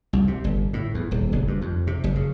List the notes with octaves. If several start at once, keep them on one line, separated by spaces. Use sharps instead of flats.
C2
C3
G1
A2
E2
D#1
F#1
G2
F2
C3
F#1
C#3